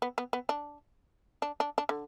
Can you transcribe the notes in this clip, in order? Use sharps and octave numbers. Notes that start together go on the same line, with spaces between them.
B3
B3
B3
D4
D4
D4
D4
D3